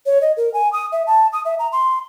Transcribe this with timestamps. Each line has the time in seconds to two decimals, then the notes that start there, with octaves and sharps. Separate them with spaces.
0.06 C#5
0.21 D#5
0.37 A#4
0.54 G#5
0.73 D#6
0.92 E5
1.07 A5
1.33 D#6
1.45 E5
1.59 A#5
1.72 C6